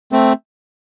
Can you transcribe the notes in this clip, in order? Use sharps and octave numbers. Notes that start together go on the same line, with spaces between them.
A3 C4